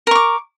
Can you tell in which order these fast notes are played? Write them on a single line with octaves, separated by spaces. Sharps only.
A#4 C#6 D6